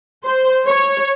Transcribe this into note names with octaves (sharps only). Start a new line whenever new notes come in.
C5
C#5